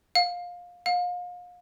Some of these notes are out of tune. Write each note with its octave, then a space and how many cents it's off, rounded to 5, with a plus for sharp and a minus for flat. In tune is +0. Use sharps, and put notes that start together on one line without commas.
F5 +20
F5 +35